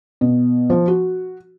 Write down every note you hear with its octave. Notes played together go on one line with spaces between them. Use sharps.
B2
F3
F#4